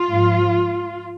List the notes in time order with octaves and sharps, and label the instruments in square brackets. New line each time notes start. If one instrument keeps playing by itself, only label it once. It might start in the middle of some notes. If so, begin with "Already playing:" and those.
Already playing: [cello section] F4
G#2 F3